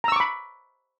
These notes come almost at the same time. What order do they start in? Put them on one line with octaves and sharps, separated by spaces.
A#5 E6 C#6 D6 B5